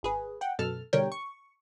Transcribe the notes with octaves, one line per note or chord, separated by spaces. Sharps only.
G#1 G#4 B4
F#5 G5
F#2 B2 A4 A5 F6
B2 D3 G3 A#4 C#5 G5
C#6